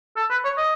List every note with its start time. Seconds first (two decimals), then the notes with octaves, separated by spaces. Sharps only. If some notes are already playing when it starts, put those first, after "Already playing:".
0.17 A4
0.30 B4
0.44 C#5
0.57 D#5